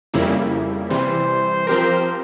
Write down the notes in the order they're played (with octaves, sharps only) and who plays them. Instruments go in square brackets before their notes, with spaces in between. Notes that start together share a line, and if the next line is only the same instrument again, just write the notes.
[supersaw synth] F2 C#3 G3 A#3 E4
[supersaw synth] C3 E3 G3 [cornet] C5
[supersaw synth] F3 C4 G4 A#4 [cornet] C5